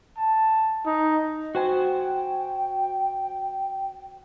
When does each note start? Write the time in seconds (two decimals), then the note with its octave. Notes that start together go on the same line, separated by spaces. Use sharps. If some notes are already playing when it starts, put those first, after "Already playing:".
0.17 A5
0.86 D#4
1.55 F#4 C5 G5 G#5